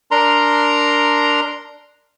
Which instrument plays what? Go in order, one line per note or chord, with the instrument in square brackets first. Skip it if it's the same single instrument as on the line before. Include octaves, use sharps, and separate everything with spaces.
[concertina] D4 A#4 A#5 C6